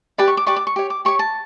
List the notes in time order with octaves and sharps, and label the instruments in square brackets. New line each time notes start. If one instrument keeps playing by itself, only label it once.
[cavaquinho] G4 B4 D5 B5
C#6
D6
G4 B4 D5 C#6
D6
C#6
G4 C#5
D6
G4 C#5 C#6
A5